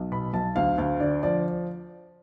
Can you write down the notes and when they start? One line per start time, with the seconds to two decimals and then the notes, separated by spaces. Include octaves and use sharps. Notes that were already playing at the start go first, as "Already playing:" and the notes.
Already playing: B1
0.12 B2 B5
0.33 B1 A5
0.56 D2 F5
0.78 D2 F5
1.00 D3 D5
1.23 F3 D5